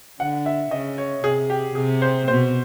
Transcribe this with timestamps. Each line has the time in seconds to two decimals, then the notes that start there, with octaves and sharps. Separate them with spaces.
0.19 D3 F#5
0.46 E5
0.71 C#3 D#5
0.98 C#5
1.24 C3 G#4
1.50 G4
1.75 C3 G#4
2.02 C5
2.28 B2 C5